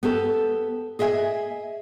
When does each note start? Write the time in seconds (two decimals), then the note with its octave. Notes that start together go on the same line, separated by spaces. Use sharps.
0.03 B3 G4 A4
0.99 G#4 D#5 E5 G5 G#5